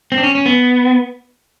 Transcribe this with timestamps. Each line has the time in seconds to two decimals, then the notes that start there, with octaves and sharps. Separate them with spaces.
0.12 C4
0.18 D4
0.24 C#4
0.35 C#4
0.46 B3